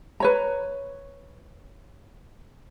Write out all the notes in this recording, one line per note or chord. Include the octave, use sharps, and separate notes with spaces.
B4 C#5 A#5